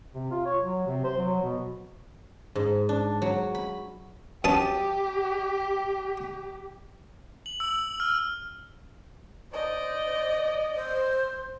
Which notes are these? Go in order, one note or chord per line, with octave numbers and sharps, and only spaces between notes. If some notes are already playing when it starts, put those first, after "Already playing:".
C3
F4
C#5
F#3
C3
C5
F#3
B2
G#2
D4
F#3
B5
F#2 G4 A5 D#6
F#7
E6
F6
C5 D5 D#5
C5